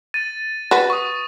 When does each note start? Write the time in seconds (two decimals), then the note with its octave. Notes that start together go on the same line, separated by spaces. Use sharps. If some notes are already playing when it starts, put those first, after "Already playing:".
0.14 A6 D#7
0.71 F#4 B4
0.90 C#6 D#6